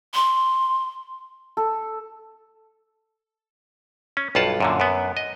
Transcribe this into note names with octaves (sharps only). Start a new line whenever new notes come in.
C6
A4
C#4
B1 G2 F4 F#5 A5
F#2 A#2 D3
F#2 B3
D#5